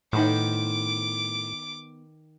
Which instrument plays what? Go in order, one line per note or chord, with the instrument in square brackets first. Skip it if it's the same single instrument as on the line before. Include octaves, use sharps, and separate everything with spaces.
[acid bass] A2 [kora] D#3 B3 C5 [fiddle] D6